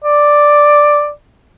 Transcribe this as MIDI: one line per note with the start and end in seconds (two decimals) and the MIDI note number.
0.04 1.10 74